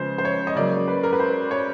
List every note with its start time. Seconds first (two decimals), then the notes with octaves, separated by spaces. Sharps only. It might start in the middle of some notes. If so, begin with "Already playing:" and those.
Already playing: C#3 F3 G#3 B3 C5
0.18 C5
0.25 C#5
0.47 D#5
0.56 C#3 F#3 A#3 D5
0.88 B4
1.03 A#4
1.13 B4
1.20 C5
1.51 C#5